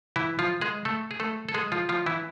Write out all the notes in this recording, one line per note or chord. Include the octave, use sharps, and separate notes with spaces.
E3 E4
F3 F4
G#3 G#4
A3 A4
G#4
A3 A4
A4
G#3 G#4
F3 F4
F3 F4
E3 E4